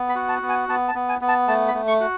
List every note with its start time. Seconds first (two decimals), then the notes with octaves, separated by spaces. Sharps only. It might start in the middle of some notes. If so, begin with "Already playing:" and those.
Already playing: B3
0.09 B5
0.15 F#4
0.29 A5
0.42 B3
0.49 G#5
0.69 B3 A5
0.88 A5
0.95 B3
1.09 G#5
1.21 B3
1.28 A5
1.48 A3 A5
1.68 B5
1.74 A3
1.88 C#6
2.00 F#4